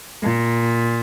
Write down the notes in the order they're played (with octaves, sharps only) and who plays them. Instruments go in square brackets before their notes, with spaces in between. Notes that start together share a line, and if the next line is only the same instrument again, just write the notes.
[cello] A#2